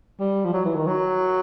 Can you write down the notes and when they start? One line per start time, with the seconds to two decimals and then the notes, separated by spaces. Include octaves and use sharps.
0.20 G3
0.45 F3
0.54 F#3
0.65 E3
0.76 D#3
0.87 F#3